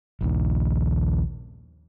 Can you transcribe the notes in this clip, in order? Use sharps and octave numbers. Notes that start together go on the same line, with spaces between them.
A#1 D#2